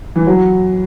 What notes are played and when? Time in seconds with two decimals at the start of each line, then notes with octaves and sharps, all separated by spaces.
0.16 E3
0.27 F#3